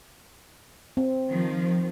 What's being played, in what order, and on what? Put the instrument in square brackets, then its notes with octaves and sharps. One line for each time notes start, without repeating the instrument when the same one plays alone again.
[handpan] C4
[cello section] D#3 F3